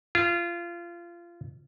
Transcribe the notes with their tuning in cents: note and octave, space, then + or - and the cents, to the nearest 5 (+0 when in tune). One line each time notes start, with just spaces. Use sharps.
F4 -25